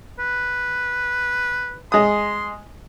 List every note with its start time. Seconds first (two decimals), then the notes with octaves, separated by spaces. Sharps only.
0.19 B4
1.92 G#3 C6 D#6